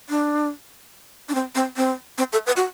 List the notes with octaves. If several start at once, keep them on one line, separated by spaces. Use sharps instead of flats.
D4
D4
C4
C4
C4
C4
A4
B4
F#4